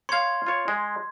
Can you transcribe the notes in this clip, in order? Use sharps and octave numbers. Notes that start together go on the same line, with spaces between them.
C#5 F5 C6 G#6
F4 C#5
G#3